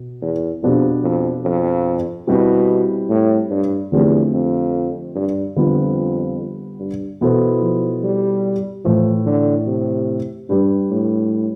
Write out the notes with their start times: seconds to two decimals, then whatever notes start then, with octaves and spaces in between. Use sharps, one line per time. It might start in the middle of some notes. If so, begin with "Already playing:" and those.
Already playing: B2
0.22 E2
0.63 F2 B2 B3 D4 G4
1.04 F2
1.45 F2
2.27 B2 G3 C4 E4 G4
3.09 A2
3.50 G2
3.92 E2 D3 F3 A3 C4 G4
4.33 F2
5.15 G2
5.56 F2 D3 G3 B3 F4 B4
6.80 G2
7.21 B2 E3 B3 E4 A4 C5
7.62 F3
8.03 G3
8.85 A2 E3 F3 A3
9.26 D3
9.67 C3
10.49 G2 G3 D4 G4 B4
10.91 A2